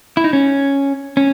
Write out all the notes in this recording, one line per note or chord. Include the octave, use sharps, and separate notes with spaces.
E4
D#4
C#4
C#4